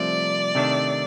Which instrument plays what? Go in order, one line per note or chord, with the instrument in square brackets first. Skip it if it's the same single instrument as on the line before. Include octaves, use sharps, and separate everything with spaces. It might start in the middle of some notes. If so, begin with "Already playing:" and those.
Already playing: [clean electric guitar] C2 C3 F3 A3 [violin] D5
[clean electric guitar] C3 D#3 A3 D4